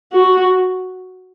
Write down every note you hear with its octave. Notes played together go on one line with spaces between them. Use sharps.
F#4